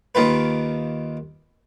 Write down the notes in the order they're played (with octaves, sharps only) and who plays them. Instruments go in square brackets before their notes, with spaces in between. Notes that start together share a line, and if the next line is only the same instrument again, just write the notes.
[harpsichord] D#2 D#3 F4 B4